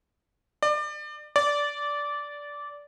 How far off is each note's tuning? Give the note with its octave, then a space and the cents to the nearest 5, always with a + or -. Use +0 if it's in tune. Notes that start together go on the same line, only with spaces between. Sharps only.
D5 +30
D5 -15